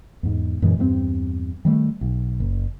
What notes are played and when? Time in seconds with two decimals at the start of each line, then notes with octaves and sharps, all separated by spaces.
0.23 E2 G#2
0.62 F#2 A#2 E3 G#3
0.78 E2 G2 G3 C4
1.65 D#3 G3 A3
2.01 B1
2.40 F#1